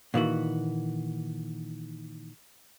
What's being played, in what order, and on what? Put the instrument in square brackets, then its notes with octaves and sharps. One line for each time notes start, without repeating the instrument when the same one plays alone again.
[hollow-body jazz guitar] A#2 D#3 E3 F#4